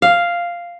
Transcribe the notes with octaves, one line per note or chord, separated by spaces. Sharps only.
F5